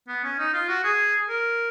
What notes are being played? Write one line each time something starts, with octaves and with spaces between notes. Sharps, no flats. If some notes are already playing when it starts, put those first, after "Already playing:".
B3
C#4
D#4
F4
F#4
G#4
A#4